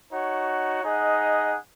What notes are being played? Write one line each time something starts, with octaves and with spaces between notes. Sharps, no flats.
D#4 F#4 C#5 F#5
D#4 G#4 D#5 F#5